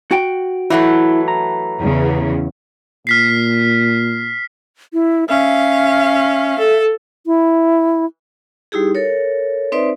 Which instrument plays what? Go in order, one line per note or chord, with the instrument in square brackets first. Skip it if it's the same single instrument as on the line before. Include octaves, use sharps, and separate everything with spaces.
[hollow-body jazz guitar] F#4 G5
[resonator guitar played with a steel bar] E3 F#3 A3 [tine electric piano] E4
[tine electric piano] A#5
[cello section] E2 C#3
[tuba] A#2 [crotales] F6 B6 C7
[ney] E4
[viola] C#4 F5 [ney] E5
[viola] A4
[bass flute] E4
[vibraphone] G3 D#4 E4 G4 G#4
A4 A#4 C#5
C4 D#4 B4 C5 D5 E5